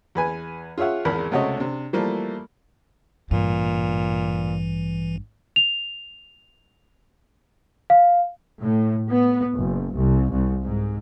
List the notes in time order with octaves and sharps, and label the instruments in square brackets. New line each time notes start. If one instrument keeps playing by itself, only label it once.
[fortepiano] E2 B4 G#5
F4 G#4 C#5 E5 F#5
G#1 E2 A#4 B5
C#2 C3 A3 F#4 C#5 D#5
C3 D4
E3 F3 G3 A3 A#3
[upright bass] A1 G2 [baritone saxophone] A#2 [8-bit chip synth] E3
[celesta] F7
F5
[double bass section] A2
B3
F#1
C2
C2
G#2